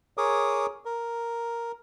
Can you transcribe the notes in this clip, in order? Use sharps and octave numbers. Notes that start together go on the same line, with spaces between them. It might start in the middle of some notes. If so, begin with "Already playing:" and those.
G#4 A#4 C#5 D6 D#6
A#4